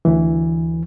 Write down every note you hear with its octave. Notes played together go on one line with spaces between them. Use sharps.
D2 E3